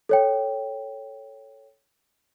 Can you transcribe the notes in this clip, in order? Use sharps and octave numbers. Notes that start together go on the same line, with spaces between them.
A4 C#5 G5